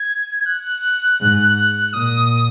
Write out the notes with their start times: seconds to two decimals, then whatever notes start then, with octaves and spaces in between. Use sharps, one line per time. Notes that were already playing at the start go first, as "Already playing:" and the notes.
Already playing: G#6
0.46 F#6
1.20 G#2
1.93 A#2 D#6